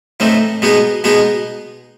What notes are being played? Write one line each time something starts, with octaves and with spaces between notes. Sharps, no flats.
A2 E3 A3 C4 D#4
B2 G#3 B3 D#4 G#4
B2 G#3 B3 D#4 G#4